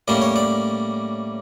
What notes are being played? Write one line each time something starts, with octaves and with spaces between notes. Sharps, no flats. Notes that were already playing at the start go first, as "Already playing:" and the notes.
A2 G3 A#3 C#4 D5
C#5
D5